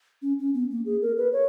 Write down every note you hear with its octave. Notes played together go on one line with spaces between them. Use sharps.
C#4
C#4
B3
A#3
G#4
A#4
B4
C#5